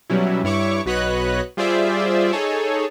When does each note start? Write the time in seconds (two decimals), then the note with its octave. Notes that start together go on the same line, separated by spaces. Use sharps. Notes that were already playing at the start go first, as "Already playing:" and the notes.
0.10 B2 F#3 G3 C#4 E4
0.44 G2 E4 C#5 C#6 D6
0.86 B1 F#4 B4 C#5 D#5 F#6
1.57 G3 F4 G#4 C5 D5 E5
2.33 D#4 G#4 A4 C#5